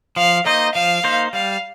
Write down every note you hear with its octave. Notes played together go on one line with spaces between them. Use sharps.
F3 F5
A#3 D#4 C5 D#5
F3 F5
A#3 D#4 C5
G3 F5